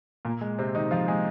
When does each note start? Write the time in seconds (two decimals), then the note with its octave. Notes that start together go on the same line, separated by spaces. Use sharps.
0.25 A#2 A#3
0.41 G#3
0.58 C3 C4
0.75 D#3 D#4
0.91 F3 F4
1.08 G#3 G#4